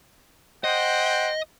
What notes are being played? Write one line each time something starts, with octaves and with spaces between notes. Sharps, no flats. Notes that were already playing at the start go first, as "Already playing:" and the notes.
C5 D#5 F#5 G5